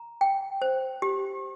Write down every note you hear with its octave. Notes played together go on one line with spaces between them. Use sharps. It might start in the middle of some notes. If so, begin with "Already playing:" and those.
Already playing: A#5
G5
C5
G4